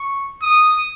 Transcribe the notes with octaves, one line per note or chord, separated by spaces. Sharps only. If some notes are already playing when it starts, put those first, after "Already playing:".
Already playing: C#6
D#6